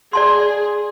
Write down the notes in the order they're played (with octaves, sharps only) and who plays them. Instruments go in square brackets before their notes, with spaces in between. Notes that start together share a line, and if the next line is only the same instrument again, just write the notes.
[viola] G#4 [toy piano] D5 A5 C6